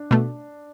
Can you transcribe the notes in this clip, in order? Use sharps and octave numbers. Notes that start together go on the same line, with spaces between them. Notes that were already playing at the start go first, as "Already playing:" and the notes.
Already playing: D4
B2 A3